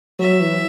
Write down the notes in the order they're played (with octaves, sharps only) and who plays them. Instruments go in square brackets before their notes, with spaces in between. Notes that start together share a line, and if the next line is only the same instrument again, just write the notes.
[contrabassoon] F#3 [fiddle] E5
[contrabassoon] E3